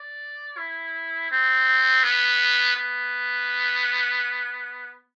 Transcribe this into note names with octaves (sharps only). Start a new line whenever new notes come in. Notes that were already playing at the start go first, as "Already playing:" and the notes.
Already playing: D5
E4
C4
B3
B3